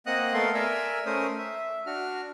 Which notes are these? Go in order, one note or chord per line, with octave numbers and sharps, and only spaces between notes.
A#3 C4 D#5 F#5 D#6 F#6
A3 B3 A4 A#4 F5 C6
A#4 D5 E5 G#5 A#5 E6
A3 C#4 A#4 C5 D#6
E5
D4 F#4 F6